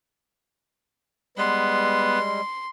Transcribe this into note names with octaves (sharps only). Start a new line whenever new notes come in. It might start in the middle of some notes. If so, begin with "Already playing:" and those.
G3 G#3 B3 C6